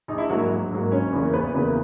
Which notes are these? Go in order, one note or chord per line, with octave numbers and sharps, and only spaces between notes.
A#1 D#4
E4
G#2 F#3 A#3 F#4
A#1
G#2 F#3 A#3
F#1 C#4 C#5
E2 C#3 E3 A#3
F#1 B3 B4
E2 C#3 E3 A#3